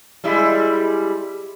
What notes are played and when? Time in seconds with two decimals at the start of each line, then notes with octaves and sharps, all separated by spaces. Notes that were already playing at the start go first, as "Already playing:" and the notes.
0.24 G3 G#3 E4